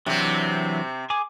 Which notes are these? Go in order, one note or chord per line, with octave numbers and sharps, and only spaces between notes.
C3 E3 F#3 C4 D4
G#4 G#5 D6